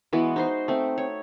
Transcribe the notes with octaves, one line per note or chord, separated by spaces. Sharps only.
E3 G#3 B3 F#4
D#4 C5 C6
A3 C4
C#5